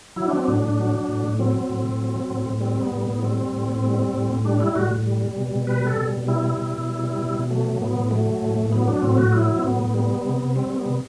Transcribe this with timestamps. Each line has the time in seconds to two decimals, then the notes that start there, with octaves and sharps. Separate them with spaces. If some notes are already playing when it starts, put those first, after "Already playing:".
0.16 F#3 E4
0.27 D4
0.33 F#3 C4
0.45 A2 D4
0.62 A2
0.78 F#3
0.94 F#3
1.09 A2
1.24 A2
1.39 F#3 C4
1.54 F#3
1.70 A2
1.85 A2
2.01 F#3
2.15 F#3
2.30 A2
2.46 A2
2.61 G3 C4
2.76 G3 B3
2.91 A2
3.01 A2 B3
3.22 G3 C4
3.38 G3
3.52 A2
3.69 A2
3.83 G3
3.99 G3
4.13 A2
4.30 A2
4.45 G3 D4
4.60 G3 E4
4.76 A2 F#4
4.91 A2
5.06 G3
5.21 G3
5.37 B2
5.51 B2
5.67 G3 B4
5.81 G3
5.87 A4
5.97 B2
6.13 B2
6.27 G3 E4
6.43 G3
6.58 B2
6.74 B2
6.89 G3
7.03 G3
7.19 B2
7.35 B2
7.50 F#3 A3
7.65 F#3
7.81 A2 B3
7.96 A2
8.11 F#3 A3
8.26 F#3
8.42 A2
8.56 A2
8.71 F#3 B3
8.87 F#3 D4
9.02 A2 C4
9.17 A2 F#4
9.32 F#3 E4
9.49 F#3
9.59 C4
9.63 A2 B3
9.79 A2
9.94 G3 B3
10.10 G3
10.25 C3
10.40 C3
10.56 G3 C4
10.70 G3
10.76 B3
10.86 C3